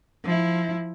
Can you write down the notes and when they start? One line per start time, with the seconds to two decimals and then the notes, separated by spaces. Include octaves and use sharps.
0.24 F3 E4